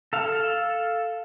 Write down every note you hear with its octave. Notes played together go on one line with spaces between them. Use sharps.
A4 F5